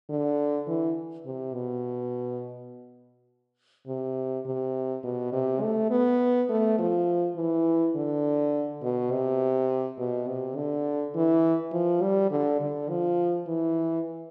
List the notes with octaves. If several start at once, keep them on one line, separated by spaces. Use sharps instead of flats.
D3
E3
C3
B2
C3
C3
B2
C3
A3
B3
A3
F3
E3
D3
B2
C3
B2
C3
D3
E3
F3
G3
D3
D3
F3
E3